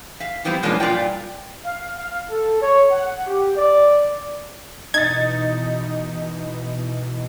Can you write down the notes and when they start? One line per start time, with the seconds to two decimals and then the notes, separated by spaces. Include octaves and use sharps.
0.20 E5 F5
0.44 G3 B3 C4 E4 F4
0.63 B2 G#3 A#3 C#4 D4 F4
0.80 G2 A#2 G3 F4 D5 G5
1.65 F5
1.96 F5
2.30 A4
2.61 C#5
2.91 F#5
3.25 G4
3.55 D5
4.94 B2 E3 D#4 G#6 A6